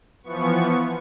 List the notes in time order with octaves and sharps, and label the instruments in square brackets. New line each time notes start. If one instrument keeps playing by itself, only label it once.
[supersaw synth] E3 F3 B3 C#6